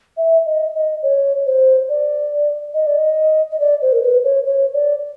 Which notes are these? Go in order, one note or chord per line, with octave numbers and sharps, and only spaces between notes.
E5
D#5
D#5
C#5
C5
D5
D#5
D5
D#5
D#5
D5
C5
A#4
B4
C#5
C#5
D5